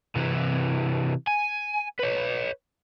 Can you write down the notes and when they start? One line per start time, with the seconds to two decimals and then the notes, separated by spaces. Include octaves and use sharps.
0.16 C3 E3
1.27 G#5
1.99 B4 C#5